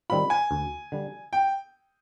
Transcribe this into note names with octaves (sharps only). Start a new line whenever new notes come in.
D#3 G3 C4 F4 B5
G#5
D2
D3 G3
G5